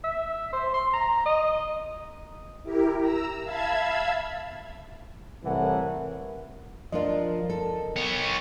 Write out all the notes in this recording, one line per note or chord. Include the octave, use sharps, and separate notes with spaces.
E5
C5
C6
A#5
D#5
E4 G4 A#4
A#5 E6
E5 F5 A5 B5 E6 G#6
C2 A2 E3 A#4 F#5
F3 D4 F4 A#4 D#5
A4
B3 C#5